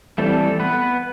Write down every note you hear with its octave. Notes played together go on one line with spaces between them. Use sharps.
E3 G3 A3 C4 A4
B3 B4